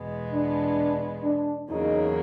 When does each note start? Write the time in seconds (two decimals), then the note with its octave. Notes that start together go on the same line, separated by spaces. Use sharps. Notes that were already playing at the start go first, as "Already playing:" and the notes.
Already playing: E2 B2 G#3 B3
0.33 D4
1.24 D4
1.70 E2 C#3 F#3 A#3 D#4